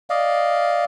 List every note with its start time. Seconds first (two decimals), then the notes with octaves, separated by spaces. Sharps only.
0.10 D5 D#5 F5